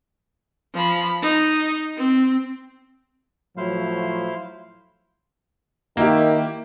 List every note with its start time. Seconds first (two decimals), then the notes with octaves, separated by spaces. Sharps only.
0.73 F3 B5
1.22 D#4
1.97 C4
3.57 A2 F3 F#3 E4 C5 F5
5.97 D#3 A#3 E4 G4